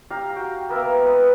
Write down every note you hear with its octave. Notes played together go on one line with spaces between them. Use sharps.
G4 F5 A#5
F#4 G5
A#3 B3 A#4 E5
B3 B4 D#5